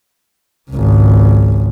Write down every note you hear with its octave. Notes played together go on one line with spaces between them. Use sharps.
G#1 C#2